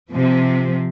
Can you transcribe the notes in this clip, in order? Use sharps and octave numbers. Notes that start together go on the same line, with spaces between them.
C3 F3